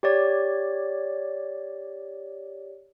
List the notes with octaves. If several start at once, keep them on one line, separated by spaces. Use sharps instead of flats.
G4 C#5 D5